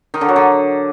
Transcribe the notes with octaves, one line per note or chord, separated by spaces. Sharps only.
D#3
D3
F#3
D3